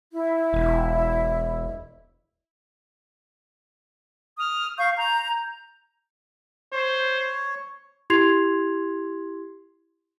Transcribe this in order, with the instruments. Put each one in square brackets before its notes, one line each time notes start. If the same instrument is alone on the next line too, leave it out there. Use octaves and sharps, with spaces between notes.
[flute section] E4
[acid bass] E1
[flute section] D#6 F6
F5 C#6 G6
A#5 G6
[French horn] C5 [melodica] C#5
[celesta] E4 G4 C6 G#6 C7 F7